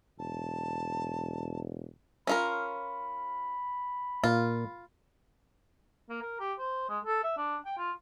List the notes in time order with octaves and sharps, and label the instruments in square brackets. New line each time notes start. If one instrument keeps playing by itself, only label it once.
[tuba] E1 [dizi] A5
[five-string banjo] C#4 F4 A#4 [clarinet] B5
[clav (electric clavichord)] A#2 A#3 [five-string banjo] F4
[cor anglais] A#3
A#4
G4
C5
G#3
A4
E5
D4
G5
F4